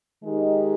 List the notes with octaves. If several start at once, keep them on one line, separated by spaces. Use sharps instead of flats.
D#3 G#3 D#4 G4